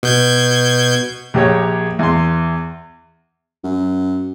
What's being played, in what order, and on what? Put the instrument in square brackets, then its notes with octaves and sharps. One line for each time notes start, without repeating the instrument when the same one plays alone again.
[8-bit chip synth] B2 G6 G#6
[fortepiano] A#1 A#3 G4 G#4 C#5
E2 C6
[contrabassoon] F#2